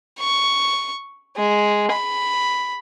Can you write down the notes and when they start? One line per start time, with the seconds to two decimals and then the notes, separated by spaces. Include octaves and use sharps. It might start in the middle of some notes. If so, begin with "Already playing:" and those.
0.20 C#6
1.37 G#3
1.92 B5